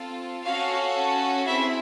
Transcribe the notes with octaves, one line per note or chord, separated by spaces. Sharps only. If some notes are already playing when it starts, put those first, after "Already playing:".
Already playing: C4 F4 A4
C#4 F#4 A4 F5
C4 E4 G#4 E5